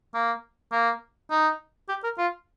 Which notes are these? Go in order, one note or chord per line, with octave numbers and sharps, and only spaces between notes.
A#3
A#3
D#4
G4
A#4
F4